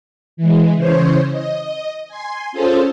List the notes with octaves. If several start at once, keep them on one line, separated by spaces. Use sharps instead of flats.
E3 G#3
C#3 E3 C5 C#5
D#5
G#5 C6
C#4 F4 G#4 A4 C5 A5